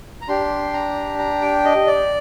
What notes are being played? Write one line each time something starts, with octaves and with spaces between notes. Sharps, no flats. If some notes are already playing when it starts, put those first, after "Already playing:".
A#5
D4 G4 C6
A#5
A#5
G5
D#5
D5